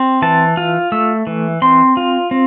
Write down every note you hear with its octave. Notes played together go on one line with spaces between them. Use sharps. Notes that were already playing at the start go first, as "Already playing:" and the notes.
Already playing: C4
E3 A5
F4
A3 E6
E3
C4 C6
F4
C4